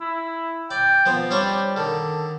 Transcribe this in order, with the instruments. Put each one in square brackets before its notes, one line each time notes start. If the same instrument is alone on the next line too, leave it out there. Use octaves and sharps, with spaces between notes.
[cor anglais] E4
[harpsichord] D5 [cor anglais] G5
[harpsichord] F3 B3 C4
[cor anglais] G3 [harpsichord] C4 D4 C#5
[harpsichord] D3 D#3 [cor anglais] A4